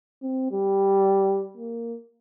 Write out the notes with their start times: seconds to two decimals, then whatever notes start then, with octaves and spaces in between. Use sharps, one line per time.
0.22 C4
0.51 G3
1.57 A#3